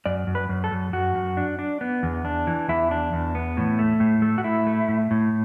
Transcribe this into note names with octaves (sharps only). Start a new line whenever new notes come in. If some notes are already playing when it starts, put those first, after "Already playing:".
F#2 D5
F#2
B4
F#2
A4
F#2
F#2 F#4
F#2
D4
D4
B3
E2
D4
E3
E2 E4
D4
E2
B3
A2
A3
A2
A3
F#4
A2 E4
A3
A2
A2